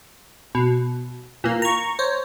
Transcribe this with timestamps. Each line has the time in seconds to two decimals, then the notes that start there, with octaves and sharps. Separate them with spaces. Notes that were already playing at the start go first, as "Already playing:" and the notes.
0.55 B2
1.44 A#2 E3 A#3
1.62 A#5 C#6
1.99 C5 C#5